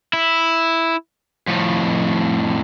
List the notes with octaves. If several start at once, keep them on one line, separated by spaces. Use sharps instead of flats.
E4
F2 A2